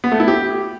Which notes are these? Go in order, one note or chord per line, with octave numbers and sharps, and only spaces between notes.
B3
A3
E4
G4